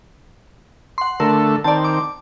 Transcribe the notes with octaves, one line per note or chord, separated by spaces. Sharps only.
F#5 C6
D3 A3 A4 A#4
D#3 C4 D5 A5
D6